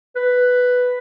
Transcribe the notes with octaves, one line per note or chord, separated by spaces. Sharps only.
B4